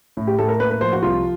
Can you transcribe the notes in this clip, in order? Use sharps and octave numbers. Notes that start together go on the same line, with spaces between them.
A2
G4
A2 A4
A#4
A#3 B4
B4
F3 C5
F#4
C2 F4